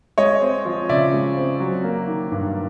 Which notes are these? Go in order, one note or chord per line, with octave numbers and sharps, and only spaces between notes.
G#3 C#5 D#5
C4
F3
C#3 D5 E5
G#3
C4
F#3
A#3
D#3
G2